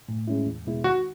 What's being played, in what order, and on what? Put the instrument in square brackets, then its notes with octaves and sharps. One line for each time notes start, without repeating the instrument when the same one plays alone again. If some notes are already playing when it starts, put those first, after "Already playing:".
[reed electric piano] A2
G#3 C#4 E4
E2
B2 G#3 B3 E4
[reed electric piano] D#3 [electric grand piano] F#4